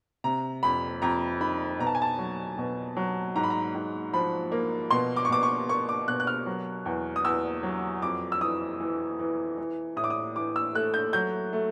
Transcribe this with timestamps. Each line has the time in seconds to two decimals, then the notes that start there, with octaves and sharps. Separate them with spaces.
0.24 C3 A#5
0.63 F2 B5
1.02 F2 A#5
1.41 D#3 B5
1.79 B2 A#5
1.87 A5
1.95 G#5
2.02 A5
2.19 F#3
2.58 B2
2.97 F#3
3.36 G#2 A#5
3.43 B5
3.50 A#5
3.74 G#2
4.13 F3 B5
4.52 A#3
4.91 B2 C6
5.16 D6
5.25 C#6
5.29 B2 D6
5.43 C#6
5.68 A#3 C#6
5.89 D6
6.08 B2 F#6
6.20 F#6
6.27 F6
6.46 F#3
6.86 E2
7.16 D#6
7.25 E2 E6
7.63 F#3
8.02 F2 D6
8.32 E6
8.41 E3 D#6
8.80 E3
9.19 E3
9.58 E3
9.96 A2 D#6
10.04 D6
10.10 D#6
10.36 E3 D6
10.56 E6
10.75 A3 F#6
10.94 G6
11.13 F#3 G6
11.53 A3